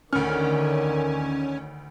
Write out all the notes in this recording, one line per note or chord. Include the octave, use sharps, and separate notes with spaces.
D2 D3 D#3 C#4 A#4 F6